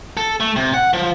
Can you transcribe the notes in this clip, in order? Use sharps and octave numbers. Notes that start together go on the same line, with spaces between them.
A4
A3
C3
F#5
F3